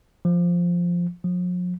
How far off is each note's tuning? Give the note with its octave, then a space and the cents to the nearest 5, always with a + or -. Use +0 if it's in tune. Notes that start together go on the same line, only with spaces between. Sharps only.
F3 +0
F3 +45